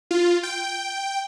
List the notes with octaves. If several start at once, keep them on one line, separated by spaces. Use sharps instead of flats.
F4
G5